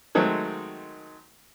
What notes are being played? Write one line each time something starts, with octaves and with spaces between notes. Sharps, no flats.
D#3 F#3 G#3 A3 C4